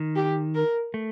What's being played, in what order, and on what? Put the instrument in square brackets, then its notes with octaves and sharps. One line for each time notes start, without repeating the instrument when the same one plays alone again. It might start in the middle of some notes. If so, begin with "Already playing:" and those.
Already playing: [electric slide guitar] D#3
[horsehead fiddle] G4
A#4
[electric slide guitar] A3